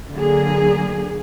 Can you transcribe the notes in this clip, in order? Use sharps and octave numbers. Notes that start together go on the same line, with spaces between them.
D3 F#3 A#3 G#4